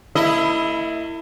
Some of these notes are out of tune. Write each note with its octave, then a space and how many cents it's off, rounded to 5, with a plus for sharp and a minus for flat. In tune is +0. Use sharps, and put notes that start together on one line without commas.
A#3 -45 E4 +0 D#5 +5